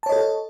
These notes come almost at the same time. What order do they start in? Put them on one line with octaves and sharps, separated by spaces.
A5 C#5 D#5 A4